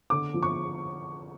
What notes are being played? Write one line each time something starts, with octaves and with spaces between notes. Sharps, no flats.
D3 D6
F3
C#6